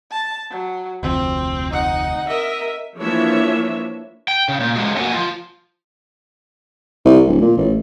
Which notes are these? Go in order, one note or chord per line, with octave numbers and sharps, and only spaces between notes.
A5
F#3
F1 D2 F3 C4
D#4 F#5
A#4 D#5 E5
E3 F3 A#3 D4 C#5 E5
G5
C#3
A#2
C#3 F3 F#3 G#3 F#4 G#4
A#3 F#4 A#4 D#5 F#5 G#5
F3 F4
C2
D1
A#2
A1